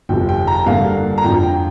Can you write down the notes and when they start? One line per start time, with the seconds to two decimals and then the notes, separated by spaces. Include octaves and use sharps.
0.09 G1 F2 C3 G5
0.29 G5
0.47 A#5
0.66 G2 D3 A#3 D4 F5
1.18 A#5
1.24 F2 F3 D4 G5
1.43 G5